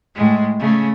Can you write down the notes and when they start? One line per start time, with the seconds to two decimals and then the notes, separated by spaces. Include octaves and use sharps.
0.15 A2 G#3
0.59 C#3 A3